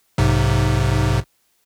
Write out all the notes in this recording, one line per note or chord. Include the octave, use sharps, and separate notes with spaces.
B1 G#2 C3